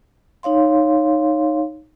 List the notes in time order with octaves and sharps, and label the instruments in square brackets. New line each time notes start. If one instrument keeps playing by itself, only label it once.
[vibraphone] D#4 C#5 F5 C6